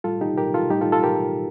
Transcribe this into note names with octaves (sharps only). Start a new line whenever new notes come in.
A2 G3 F4 A4
D#4 G4
G4 A#4
F4 A4
A2 G3 D#4 G4
F4 A4
F4 A4
G4 A#4